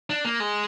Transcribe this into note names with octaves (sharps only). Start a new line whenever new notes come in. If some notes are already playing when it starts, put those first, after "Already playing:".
D4
A#3
G#3